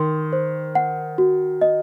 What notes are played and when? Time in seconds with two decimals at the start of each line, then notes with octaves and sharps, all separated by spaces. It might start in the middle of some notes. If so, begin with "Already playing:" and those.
Already playing: D#3 C6
0.33 C5
0.75 F#5
1.18 F#4
1.61 D#5